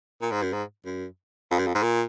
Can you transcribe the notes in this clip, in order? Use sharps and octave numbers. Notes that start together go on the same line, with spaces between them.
A#2
G#2
F#2
G#2
F#2
F2
F#2
F2
G#2
A#2